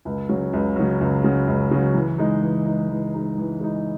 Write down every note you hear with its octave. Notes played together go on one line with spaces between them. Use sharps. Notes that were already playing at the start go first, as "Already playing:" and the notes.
C#2
C#3 F#3
C#2
C#3 F#3
C#2
C#3 F#3
C#2
C#3 F#3
E3
G#3 D#4
E3
G#3 D#4
E3
G#3 D#4
E3
G#3 D#4